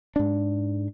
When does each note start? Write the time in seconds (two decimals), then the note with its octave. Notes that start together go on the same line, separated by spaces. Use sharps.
0.16 G#2 D4